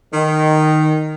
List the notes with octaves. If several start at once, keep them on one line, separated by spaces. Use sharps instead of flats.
D#3